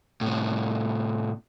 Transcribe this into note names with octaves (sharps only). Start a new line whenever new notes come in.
A2 C3